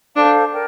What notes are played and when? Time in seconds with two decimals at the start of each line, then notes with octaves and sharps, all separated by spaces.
0.16 D4 A4 C5 F5 A5
0.52 A#4 D5 G5